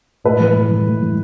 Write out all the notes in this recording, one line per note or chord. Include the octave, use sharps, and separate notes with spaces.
A2 B4
E3
A2
E3
A2
E3